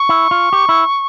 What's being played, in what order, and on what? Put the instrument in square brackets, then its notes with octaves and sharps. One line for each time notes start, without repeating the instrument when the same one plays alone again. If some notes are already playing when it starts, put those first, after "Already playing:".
Already playing: [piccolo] C#6
[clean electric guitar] E4
F4
G4
E4